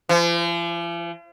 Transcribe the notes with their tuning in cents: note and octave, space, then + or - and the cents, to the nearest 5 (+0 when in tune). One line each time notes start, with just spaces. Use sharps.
F3 -45